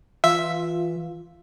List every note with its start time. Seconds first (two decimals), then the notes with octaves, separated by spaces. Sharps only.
0.24 E3 F4 E5